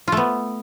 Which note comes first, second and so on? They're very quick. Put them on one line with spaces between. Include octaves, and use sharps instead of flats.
F4 A3 B3